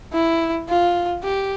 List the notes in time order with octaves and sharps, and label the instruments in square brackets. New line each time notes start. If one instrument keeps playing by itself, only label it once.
[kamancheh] E4
F4
G4